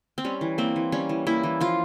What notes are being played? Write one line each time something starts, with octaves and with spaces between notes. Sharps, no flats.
C4
G3 C#4
E3
A#3 C4
E3
G3 C#4
E3
A#3 E4
E3
F3 F4